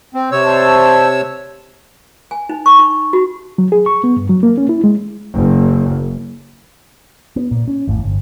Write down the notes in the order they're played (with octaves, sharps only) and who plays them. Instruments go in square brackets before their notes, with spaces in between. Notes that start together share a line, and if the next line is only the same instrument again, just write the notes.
[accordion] C4 [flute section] C5
[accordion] C3 C#5 E6
[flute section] C5 D5 A5
[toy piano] G#5
D#4
C#6
D#4
F#4
[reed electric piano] F#3
G#4
C#6
B3
G2
F#3
A#3
C#4
E4
G#3
[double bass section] F#1
[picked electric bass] B3
A#2
C#4
G#1 E2 A2
G1